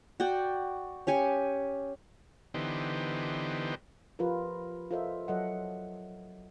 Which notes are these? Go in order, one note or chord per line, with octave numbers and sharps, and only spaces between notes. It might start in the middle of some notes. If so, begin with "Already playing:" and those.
F#4 D5 G5
C#4 G4 G#5 C#6
D3 E3 B3 D#4 G4 C5
F3 F4 G4 A#4 B4
F4 A4 A#4 C5 D#5 E5
F#3 A4 D#5 E5 F#5